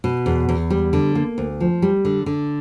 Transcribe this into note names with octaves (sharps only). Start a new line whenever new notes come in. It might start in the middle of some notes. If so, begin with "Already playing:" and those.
B2
E2
E2
G3
D3
A#3
D2
F3
G3
D3
D3